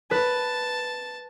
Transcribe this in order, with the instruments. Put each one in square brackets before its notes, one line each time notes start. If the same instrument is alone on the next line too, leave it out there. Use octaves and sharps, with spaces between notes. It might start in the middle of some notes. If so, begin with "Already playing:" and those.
[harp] B4 [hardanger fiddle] A5